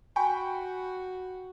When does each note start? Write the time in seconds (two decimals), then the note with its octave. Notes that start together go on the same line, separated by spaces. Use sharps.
0.16 F#4 G5 G#5 B5 C#6